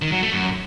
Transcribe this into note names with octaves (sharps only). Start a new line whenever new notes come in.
D#3
F#3
A3
F#2